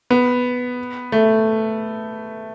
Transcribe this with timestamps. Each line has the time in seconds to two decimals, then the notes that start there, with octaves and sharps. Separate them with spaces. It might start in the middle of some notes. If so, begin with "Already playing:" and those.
0.10 B3
1.12 A3